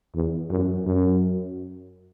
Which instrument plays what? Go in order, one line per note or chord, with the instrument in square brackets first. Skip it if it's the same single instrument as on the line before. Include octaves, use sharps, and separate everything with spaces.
[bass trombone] E2
F#2
F#2